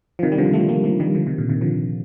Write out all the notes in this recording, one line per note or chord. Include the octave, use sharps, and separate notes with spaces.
F3
C3 D#3
G3
D3 F3
F3 A3
G3 A#3
F3 A3
D#3 G3
D3 F3
C3 D#3
A#2 D3
C3 D#3
D3 F3